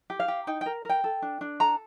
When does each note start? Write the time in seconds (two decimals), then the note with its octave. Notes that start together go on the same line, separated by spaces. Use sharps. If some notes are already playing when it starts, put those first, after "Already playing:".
0.10 G4
0.20 F5
0.28 G4
0.47 D#4 G5
0.61 A#4 G5
0.85 A#4 G5
1.04 A4
1.22 D4
1.41 D4
1.60 A4 A#5